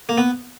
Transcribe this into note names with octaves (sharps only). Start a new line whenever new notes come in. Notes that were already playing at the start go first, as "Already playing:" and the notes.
A#3
B3